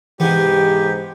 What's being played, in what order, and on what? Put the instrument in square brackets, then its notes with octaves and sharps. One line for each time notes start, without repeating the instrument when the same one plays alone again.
[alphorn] G#2 [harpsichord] C3 B3 [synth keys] E3 [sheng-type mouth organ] G4